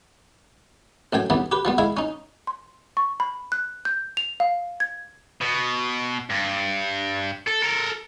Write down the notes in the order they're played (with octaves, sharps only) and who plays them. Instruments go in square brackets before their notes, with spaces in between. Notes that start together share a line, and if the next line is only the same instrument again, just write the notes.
[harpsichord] A1 F#2 G5 G#5
D#2 C3 E3 G3 B3
G4 B4
F3 G3 B3
G#3 E4 F5 G#5
C#4 D#4
[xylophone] C6
C#6
B5
F#6
G6
F7
F5
G#6
[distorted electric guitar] B2
G2
A4
A4 A#4